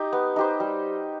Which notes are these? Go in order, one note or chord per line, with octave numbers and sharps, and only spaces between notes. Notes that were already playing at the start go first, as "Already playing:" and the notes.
Already playing: D#4 G4
B3
D#4 G4 C5
G3